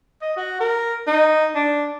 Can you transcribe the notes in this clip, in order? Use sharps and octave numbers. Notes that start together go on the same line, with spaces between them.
D#5
F#4
A#4
D#4
D4